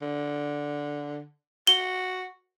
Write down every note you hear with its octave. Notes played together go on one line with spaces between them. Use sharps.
D3
F#4 G7